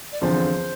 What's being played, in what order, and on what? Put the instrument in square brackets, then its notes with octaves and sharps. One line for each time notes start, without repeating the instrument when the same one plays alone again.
[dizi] D5
[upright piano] E2 D3 F3 C4 [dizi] C5